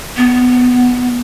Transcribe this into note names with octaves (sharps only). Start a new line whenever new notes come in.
B3